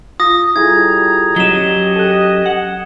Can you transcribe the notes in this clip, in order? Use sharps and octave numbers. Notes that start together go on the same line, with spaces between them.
F4 D#6 A#6
G3 E4 F4 G#4 A4 A#5 G#6
F#3 C#4 G4 D#5 E7 G7
A4 F#6
F#5